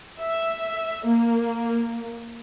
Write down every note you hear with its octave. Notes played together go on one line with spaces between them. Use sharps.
E5
A#3